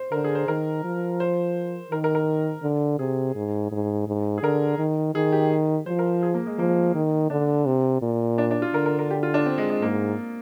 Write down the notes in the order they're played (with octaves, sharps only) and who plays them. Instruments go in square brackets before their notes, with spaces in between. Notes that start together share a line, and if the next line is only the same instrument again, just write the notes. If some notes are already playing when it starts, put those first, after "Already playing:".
Already playing: [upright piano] C5
[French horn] D3 [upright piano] A#4
[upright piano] G#4
C5
[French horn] D#3 [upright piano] A#4
[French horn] F3
[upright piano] C5
[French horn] D#3 [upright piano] A#4
[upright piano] A#4
A#4
[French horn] D3
[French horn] C3 [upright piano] G#4
[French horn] G#2
G#2
G#2
[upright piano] G#4
[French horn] D3 [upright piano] A#4
[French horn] D#3
[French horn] D#3 [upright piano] G#4
[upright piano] G4
[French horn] F3 [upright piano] C5
[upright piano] A#4
G#4
A#3
G#3
[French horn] F3 [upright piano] A#3
[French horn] D#3
[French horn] D3 [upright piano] D4
[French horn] C3
A#2
[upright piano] D4
D4
F4
[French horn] D3 [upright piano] A#4
[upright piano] A#4
A#4
G4
F4
D4
C4
G#3
G#3
[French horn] G#2 [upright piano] A#3